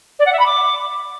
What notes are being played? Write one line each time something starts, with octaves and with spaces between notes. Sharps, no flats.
D5
F#5
E5
B5
D6